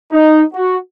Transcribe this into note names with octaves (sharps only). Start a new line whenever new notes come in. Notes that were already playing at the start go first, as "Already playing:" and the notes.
D#4
F#4